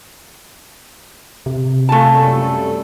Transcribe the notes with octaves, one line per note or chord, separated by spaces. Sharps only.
C3
A3 A#3 F4 G#5 A5
F#2 G3 A4